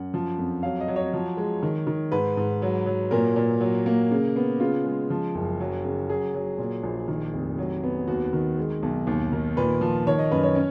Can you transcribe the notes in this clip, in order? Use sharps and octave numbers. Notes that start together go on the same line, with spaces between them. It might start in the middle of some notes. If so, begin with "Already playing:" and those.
Already playing: F#2 F#5
F3
F2
F#3 F5
D#5
F#3
C#5
F3
G#3
D#3
D#3
G#2 B4
G#2
F#3
F#3
A#2 A#4
A#2
F#3
A#3
C#3
B3
C#3 F4
G#3
F3
F#1
F#3
C#3
F#3 G#4
F#3
A#2
A#1
D#3
F1
F#3
B3
D#2 F#4
D#3
G#3
B1
D#2
D#3
A#2 B4
F3
D#3 C#5
D#5
F#2 B4
C#5
C#4